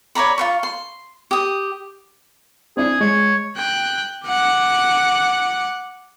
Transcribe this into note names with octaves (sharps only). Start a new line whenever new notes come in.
C#5 D5 A#5 B5
F4 C5 C#6
C6
G4 D#6
C4 D4 E4 G#4
G#3 C#5
G5 F#6
F#5 D6